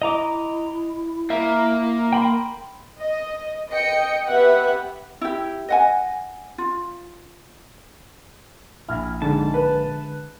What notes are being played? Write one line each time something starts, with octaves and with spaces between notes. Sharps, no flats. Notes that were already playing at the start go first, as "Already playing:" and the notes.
E4 D#5 A#5 D6
A#3 E5
G5 B5 C6
D#5
D#5 G5 C#7
B3 G4 B4 E5 F#5
E4 G4
D#5 F#5 G#5
F4
A#1 E4 F6
G#2 D3 G#3 A5
B4